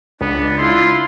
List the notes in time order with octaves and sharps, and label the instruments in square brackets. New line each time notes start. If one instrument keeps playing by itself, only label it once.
[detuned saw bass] C#2 [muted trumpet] B3 [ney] D4
[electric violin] E4 F4 [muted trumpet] C6